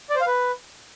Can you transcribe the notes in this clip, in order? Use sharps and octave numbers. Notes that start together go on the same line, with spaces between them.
D5
C5
F5
B4